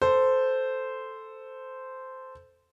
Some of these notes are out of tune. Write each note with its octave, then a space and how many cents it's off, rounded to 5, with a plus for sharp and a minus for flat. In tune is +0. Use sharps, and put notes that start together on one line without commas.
A4 +0 C5 -10